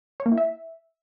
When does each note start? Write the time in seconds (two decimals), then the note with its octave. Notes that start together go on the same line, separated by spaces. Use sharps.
0.20 C#5
0.26 A#3
0.32 E4
0.38 E5